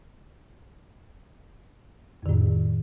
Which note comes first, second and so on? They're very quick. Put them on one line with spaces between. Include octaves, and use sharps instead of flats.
F2 D#3 A2